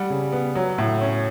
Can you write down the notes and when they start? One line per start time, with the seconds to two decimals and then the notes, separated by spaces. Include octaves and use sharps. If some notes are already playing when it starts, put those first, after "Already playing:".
Already playing: G3 F#5
0.10 C#3
0.32 B3
0.55 F#3
0.78 A2
1.01 C#4